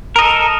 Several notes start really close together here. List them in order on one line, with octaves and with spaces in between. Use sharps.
A#4 D#5 A4